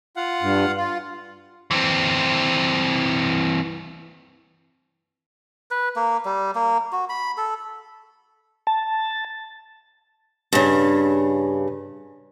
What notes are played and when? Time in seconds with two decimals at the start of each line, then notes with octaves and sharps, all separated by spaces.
0.16 F4 F5 F#5
0.42 G2
0.77 F4
1.71 E3 C4
5.71 B4
5.96 A#3
6.25 G3
6.55 A#3
6.92 F#4
7.09 B5
7.37 A4
8.67 A5
10.53 G2 C#3